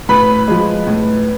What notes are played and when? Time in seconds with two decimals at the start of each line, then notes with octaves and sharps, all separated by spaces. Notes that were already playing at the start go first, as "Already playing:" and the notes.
0.09 A2 B4 B5
0.48 F3 G#3
0.87 A2